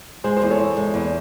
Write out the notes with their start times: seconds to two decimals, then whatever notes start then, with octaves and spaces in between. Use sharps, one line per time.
0.24 G#3 G#4 C5
0.37 G#4 C5
0.42 E2
0.50 A4 C#5
0.58 E2
0.77 G#3
0.94 E2